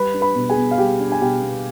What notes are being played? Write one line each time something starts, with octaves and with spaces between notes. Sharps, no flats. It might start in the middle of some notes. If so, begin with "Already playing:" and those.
Already playing: G3 B4 B5
D4
B4 B5
B2
G#4 G#5
B3
F5
G3 G4 G5
D4
G#5
B2 G4 G5
B3